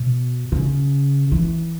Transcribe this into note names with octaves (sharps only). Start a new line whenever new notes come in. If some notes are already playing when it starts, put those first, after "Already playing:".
Already playing: B2
C#3
E3